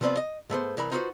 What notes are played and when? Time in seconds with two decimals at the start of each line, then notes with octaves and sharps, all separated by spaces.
0.01 C3 F3 B3 C4 D5 B5
0.17 D#5
0.50 G#2 A3 B3 C5
0.77 C2 E3 A#4 B5
0.92 D#4 F4 F#4 A4 B4 C5